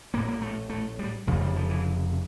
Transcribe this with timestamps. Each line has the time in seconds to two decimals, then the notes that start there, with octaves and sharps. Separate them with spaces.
0.13 A#1 A2 A#3
0.28 A#3
0.42 A3
0.70 A3
0.99 G3
1.27 F1 F2 C#3 F3
1.41 G3
1.56 F3
1.70 E3